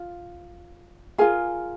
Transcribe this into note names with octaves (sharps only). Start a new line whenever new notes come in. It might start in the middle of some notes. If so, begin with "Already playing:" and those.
Already playing: F4
F4 G#4 A#4 G#5